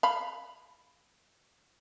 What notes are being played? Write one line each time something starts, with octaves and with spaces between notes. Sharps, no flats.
F5 B5